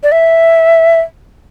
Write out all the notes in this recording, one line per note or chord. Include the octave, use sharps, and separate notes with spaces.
D5
E5